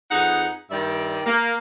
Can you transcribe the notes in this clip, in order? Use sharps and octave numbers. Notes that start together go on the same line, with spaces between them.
F2 D#4 G#4 B4 F#5
G2 D#3 G3 G4 D5 E5
A#3